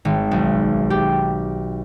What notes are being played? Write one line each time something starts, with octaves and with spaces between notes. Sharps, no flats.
G#1
B1
G4